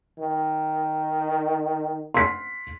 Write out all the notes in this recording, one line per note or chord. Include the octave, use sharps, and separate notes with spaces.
D#3
C6 B6